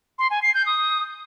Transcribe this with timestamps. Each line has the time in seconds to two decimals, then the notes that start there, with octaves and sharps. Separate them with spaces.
0.19 C6
0.31 G#5
0.42 C7
0.54 G6
0.66 D#6